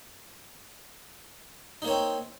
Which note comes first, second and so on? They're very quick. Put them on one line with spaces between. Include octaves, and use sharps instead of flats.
D#4 A#3 C#5 C4